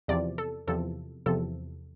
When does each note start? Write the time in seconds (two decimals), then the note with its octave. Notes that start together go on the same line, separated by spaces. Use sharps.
0.08 E2 C3 F3 D5
0.38 A4
0.67 E2 C3 F3 A4
1.26 E2 C3 F3 A4